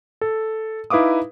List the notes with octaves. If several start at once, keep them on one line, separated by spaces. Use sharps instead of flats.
A4
D#4 E4 B4 F5 D6 D#6